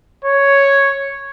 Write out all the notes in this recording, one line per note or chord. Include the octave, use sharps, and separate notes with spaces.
C#5